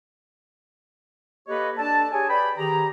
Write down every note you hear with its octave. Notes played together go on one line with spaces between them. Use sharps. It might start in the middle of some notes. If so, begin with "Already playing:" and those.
A#3 G4 A4 B4 C#5 D#5
D4 A4 D5 A5
G4 G#4 C#5 G#5
B4 D5 G5 B5
D#3 G4 G#4 A#5